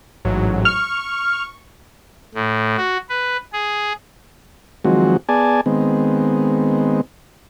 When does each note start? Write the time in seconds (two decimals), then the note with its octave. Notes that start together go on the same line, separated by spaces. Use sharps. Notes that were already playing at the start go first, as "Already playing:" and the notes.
0.25 A1 G#2 F#3
0.65 C#6 F6
2.34 A2
2.77 F#4
3.09 B4
3.53 G#4
4.85 D#3 F3 F#3 G#3 C4 F#4
5.29 B3 G#4 D5 G#5 A5
5.66 D#3 G#3 B3 C4